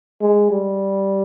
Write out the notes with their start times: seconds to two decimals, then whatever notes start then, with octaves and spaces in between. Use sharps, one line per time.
0.22 G#3
0.51 G3